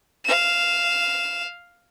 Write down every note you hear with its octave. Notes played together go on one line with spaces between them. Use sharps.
F5 E7